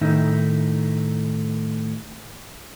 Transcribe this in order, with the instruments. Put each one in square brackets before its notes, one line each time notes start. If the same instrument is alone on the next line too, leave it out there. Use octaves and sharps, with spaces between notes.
[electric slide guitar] A2 D#3 A3 D#4 E5